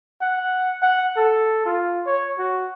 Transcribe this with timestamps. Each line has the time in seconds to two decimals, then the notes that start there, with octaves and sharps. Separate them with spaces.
0.22 F#5
0.82 F#5
1.17 A4
1.66 F4
2.06 C#5
2.39 F#4